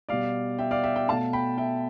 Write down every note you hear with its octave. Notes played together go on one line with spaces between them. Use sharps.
B2 G3 D5 F5
E5 G5
D5 F5
E5 G5
E5 G5
B2 A3 F5 A5
G5 B5
E5 G5